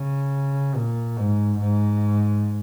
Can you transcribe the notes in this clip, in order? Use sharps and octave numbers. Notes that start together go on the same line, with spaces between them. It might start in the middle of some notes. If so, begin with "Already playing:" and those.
Already playing: C#3
A#2
G#2
G#2